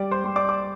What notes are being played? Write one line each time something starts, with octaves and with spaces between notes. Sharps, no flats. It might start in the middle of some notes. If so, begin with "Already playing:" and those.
Already playing: G3 D5 D6
C5 C6
G3 C6
D5 D6
D6